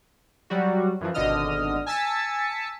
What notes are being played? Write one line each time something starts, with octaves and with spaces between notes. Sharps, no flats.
F#3 G3 F#4
F#2 E3 F3
G#1 B2 D3 D#5 D#6 F6
G#5 A5 E6 A6 B6 C#7